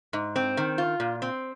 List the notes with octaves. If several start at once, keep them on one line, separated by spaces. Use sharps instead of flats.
G#2
C4
D#3
F4
A#2
C4